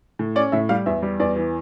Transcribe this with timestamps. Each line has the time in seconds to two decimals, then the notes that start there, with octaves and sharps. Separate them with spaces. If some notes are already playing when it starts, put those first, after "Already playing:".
0.19 A2
0.36 C#4 D5
0.52 A2 E5
0.69 G3 F5
0.86 E2 E5
1.02 G3
1.20 E2 D5
1.36 E3